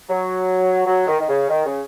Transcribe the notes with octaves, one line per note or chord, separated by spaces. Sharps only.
F#3
F#3
D#3
D#3
C#3
D#3
C#3